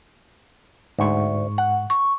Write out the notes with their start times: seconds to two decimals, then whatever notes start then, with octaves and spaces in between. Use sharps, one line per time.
0.99 D2 G#2 C#6
1.58 F#5
1.90 C#6